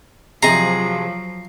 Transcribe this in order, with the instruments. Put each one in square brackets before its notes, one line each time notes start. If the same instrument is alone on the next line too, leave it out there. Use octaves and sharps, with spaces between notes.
[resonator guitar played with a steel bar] C3 G#4 D#5 [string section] F3 F#3 [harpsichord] A#5 [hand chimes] C7